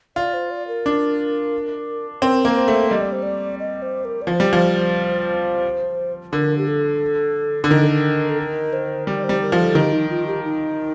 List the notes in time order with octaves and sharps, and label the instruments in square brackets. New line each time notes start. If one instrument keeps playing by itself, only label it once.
[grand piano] F4 [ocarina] D5
[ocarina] C5
D5
A#4
[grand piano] D4
[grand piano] C4 [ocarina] A#4
[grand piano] A#3
[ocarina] C5
[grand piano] A3
[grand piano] G3 [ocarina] D#5
[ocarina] D5
C5
D5
D#5
C5
A#4
D5
[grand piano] F3 [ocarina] C5
[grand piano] G3
F3
[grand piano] D3 [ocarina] A#4
[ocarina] G4
A4
[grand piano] D3
[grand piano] D#3 [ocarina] A#4
[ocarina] A4
A#4
A4
A#4
C5
[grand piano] G3 [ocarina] D5
[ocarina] C5
[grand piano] G3
[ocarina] A#4
[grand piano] F3
[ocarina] A4
[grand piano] D#3 [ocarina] G4
[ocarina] D#4
F4
G4
D#4